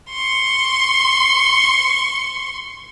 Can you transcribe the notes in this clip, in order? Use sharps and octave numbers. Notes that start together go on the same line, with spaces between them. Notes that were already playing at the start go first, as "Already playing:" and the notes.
C6 C#6